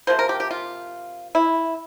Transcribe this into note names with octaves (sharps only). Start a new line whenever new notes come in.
C3 F3 A#3 C5
A#4
G4
G4
F4
E4